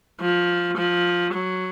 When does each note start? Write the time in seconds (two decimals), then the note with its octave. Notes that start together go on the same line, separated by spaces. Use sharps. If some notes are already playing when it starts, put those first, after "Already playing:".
0.21 F3
0.77 F3
1.34 F#3